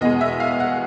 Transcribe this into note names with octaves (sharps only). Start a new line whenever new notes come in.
E2 B2 G#3 D#5
E5
F5
F#5